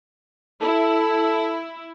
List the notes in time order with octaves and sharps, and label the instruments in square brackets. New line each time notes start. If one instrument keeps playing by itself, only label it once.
[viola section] E4 [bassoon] A4